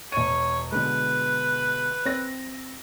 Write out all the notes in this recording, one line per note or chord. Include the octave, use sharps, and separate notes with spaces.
E1 C#5 D#7
B2 D3 G#3 B4
C4 A#6